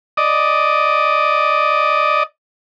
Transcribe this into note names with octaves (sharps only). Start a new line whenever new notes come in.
D5 D#5